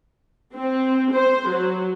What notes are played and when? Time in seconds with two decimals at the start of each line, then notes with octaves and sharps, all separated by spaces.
0.55 C4
1.13 C5
1.48 F#3